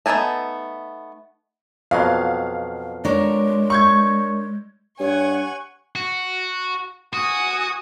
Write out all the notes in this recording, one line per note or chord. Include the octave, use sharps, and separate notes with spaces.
A3 B3 D#4 G#5 A5
F2 B2 F#3 F5
G#3 D4 A#4 C#5
C#6 G6 G#6
G2 C#5 F#5 G#5 C#6
F#4
F#4 G#5 D#6